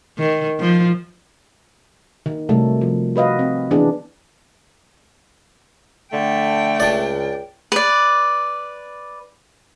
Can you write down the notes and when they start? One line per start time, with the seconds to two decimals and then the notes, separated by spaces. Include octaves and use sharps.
0.18 D#3
0.60 F3
2.26 D#3
2.49 C3 F#3 G3 A3 A4
2.81 F3
3.16 F#4 B4 D#5 F5
3.39 C4
3.71 E3 B3 D4 G#4
6.13 D3 A3 G5
6.80 C#2 D4 D5
7.72 B4 D5